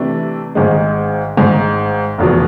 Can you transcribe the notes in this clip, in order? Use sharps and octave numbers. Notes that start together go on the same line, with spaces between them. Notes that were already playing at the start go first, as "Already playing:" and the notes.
Already playing: C3 E3 A3 D4
G#1 G#2 D#3 G#3
G#1 G#2 D#3 G#3
F1 E2 B2